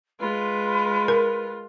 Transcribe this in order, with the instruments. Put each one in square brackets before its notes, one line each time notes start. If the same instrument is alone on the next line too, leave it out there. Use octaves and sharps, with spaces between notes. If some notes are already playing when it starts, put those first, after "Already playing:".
[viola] G#3 F4 [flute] B4
[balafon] A#4